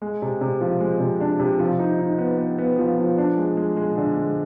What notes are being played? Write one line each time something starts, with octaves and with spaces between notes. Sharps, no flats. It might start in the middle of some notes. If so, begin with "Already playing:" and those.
G#3
C3
C3
F3
G#3
C3
D4
C3
F3
D#4
D#4
B3
B3
B3
F3
F3
D4
G#3
G#3
G#3
D3
G#3